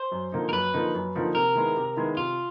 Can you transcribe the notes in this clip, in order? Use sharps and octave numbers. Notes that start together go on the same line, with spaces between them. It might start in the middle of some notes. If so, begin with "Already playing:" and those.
Already playing: C5
F#2
D3 F3 A#3 D#4
A#4
F#2 B4
D3 F3 A#3 D#4
F#2
D3 F3 A#3 D#4
C3 A#4
D#3 G#3 B3 E4
C3
D#3 G#3 B3 E4
C3 F4